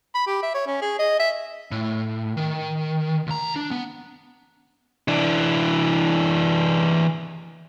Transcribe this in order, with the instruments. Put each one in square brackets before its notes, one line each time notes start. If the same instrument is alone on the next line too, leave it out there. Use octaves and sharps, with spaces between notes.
[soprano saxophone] B5
G4
E5
C#5
C#4
G#4
D#5
E5
[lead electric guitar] A2
D#3
C#2 A#5
D4
B3
E3 D4